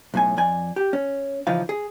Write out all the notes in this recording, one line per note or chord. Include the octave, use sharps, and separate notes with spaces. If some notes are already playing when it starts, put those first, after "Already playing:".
B1 A2 G#5
F2 D5 G#5
G4
C#4
C#3 E3 F3 D#4 F5
G#4